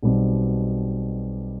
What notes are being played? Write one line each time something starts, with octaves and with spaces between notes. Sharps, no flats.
B1 B2 G3 C4